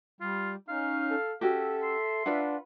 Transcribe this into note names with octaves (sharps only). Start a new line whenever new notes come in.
G3 F4
C#4 D#4 F5
A4
C#4 F#4 G4 A4 E5
C6
D4 F4 B4 F#5